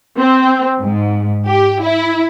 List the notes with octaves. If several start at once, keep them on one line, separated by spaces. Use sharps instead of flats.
C4
G#2
G4
E4